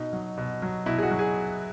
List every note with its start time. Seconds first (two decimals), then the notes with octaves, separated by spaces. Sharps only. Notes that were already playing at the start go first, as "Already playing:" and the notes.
Already playing: B2 D#4
0.13 F#3
0.38 B2
0.62 F#3
0.86 B2 E4
0.98 G#4
1.03 F#4
1.11 F#3
1.19 G#4